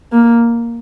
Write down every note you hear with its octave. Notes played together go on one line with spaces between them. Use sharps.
A#3